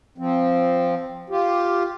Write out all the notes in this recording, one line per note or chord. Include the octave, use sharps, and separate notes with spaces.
F3 C4
F4 G4